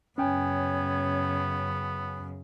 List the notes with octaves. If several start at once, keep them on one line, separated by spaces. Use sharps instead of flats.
F#2 C#3 B3 C#4 C#5 G5 G#5